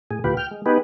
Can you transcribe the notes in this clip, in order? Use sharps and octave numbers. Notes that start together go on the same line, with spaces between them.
A2 G#4
D2 A2 F4 G4 B4
G5 F6
G#3
B3 D#4 G4 G#4 B4